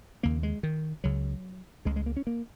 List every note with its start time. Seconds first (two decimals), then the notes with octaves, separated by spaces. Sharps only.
0.23 D#2 C#3 A#3
0.43 G#3
0.63 D#3
1.04 C#2 C#3 F#3
1.85 C#2 C#3 G#3
1.96 G#3
2.06 A#3
2.17 C#4
2.27 A#3